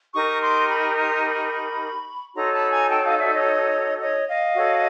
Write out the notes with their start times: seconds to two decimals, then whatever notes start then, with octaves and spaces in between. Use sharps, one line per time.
0.14 D#4 G4 A#4 C#6 D#6
0.42 C6 D6
0.70 B5 C#6
0.97 A#5 C6
1.25 B5 C#6
2.35 D#4 F#4 A4 C#5 A#5 C6
2.54 A5 B5
2.72 G#5 A#5
2.90 G5 A5
3.05 D#5 F5
3.19 D5 E5
3.32 C#5 D#5
4.01 C#5 D#5
4.28 D#5 F5
4.56 F#4 A4 C#5